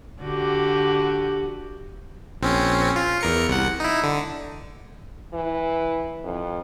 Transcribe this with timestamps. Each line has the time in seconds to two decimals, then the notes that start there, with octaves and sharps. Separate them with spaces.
0.22 D3 F#4 G4
2.41 A#1 C4 C#4
2.96 F4
3.21 E2 A#4 C#7
3.48 C2 F#5
3.80 D#4 E4
4.04 D3
5.33 E3
6.24 F2